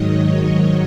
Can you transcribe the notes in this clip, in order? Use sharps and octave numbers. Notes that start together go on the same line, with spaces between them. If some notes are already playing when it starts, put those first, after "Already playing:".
Already playing: G#2 D#3 F#3 C#5 D#5
D#5